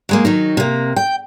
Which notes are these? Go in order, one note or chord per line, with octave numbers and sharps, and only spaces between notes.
F#3 G#3 A#3
D#3 F#3 D#4
C3 A#3
G5